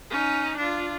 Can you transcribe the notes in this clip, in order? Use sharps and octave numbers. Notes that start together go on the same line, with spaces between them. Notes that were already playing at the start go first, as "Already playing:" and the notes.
C#4 D#4
D4 F4